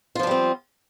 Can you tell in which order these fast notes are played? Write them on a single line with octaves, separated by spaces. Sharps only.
F4 F3 D4 G3 C4